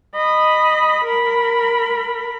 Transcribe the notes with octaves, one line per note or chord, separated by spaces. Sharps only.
D#5 B5
A#4 B5